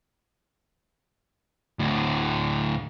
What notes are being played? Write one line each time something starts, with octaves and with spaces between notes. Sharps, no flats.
D2 A2